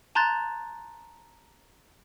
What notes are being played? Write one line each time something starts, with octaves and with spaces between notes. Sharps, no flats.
A5 A#5 C6 F#6 G6 A6